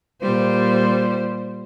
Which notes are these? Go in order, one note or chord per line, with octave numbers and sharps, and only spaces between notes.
A#2 G3 C5